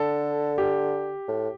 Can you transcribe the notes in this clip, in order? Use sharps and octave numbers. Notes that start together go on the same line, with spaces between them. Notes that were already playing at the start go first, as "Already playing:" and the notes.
Already playing: D3 A4
G4
A2